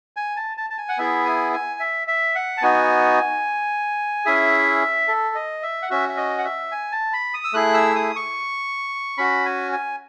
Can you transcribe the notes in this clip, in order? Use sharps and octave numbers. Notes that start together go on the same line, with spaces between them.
G#5
A5
A5
A5
G#5
F#5
B3 E4 G#4 E5
G#5
G#5
E5
E5
F#5
A5
B3 D#4 F#4 G#5
C#4 E4 G#4 E5
A4
D#5
E5
F#5
C#4 F#4 E5
E5
D#5
F#5
E5
G#5
A5
B5
D#6
E6
A3 E4 G#4 F#6
E6
D#6
C#6
C#4 F#4 B5
G#5
G#5